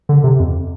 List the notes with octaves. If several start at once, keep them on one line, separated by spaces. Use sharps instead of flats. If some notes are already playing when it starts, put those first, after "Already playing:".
D3
C3
F2